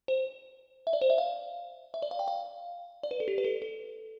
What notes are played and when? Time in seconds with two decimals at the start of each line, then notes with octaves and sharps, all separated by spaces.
0.08 C5
0.87 E5
0.93 D5
1.01 C5
1.10 E5
1.18 F5
1.94 E5
2.02 D5
2.11 F5
2.19 G5
2.28 F5
3.03 D5
3.11 B4
3.20 A4
3.28 G4
3.38 B4
3.44 A4
3.62 A4